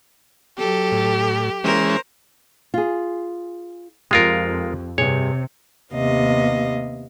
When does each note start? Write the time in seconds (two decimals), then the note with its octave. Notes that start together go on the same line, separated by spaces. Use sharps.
0.58 F#3 G4 A4
0.92 A2
1.64 E3 G#3 C#4 A#4 C5
2.74 F4 G#4
4.11 F2 G#3 F4 G4 A#4
4.98 G2 C3 G#4 C#5
5.94 D#2 C3 B3 D#5 F5